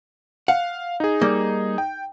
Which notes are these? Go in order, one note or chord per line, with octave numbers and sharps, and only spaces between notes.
F5 F#5
D#4 G#4
G3 A#3
G5